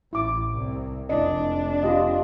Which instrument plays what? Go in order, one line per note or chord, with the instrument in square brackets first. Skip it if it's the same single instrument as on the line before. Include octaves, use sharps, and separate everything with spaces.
[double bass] A1 [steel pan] E4 D6
[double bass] C2
[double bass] F1 D4 [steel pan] E4 D#5
[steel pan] F4 G4 D#5